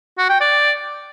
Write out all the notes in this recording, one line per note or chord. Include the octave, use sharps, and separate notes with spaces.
F#4
G5
D5